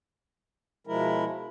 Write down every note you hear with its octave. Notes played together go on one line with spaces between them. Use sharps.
B2 F3 G#3 E4 A#4